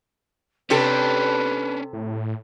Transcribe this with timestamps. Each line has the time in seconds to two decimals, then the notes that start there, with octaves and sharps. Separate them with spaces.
0.70 C3 C#4 D4 G4 A4 B4
1.93 A2